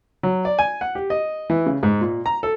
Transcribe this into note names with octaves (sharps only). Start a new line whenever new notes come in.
F#3
D5
G#5
F#5
G4
D#5
E3
C#3
G#2
A#2
A#5
A4